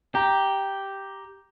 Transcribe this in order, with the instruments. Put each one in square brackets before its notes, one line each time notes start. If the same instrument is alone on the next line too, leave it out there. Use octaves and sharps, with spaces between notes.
[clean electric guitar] G4 [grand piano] A#5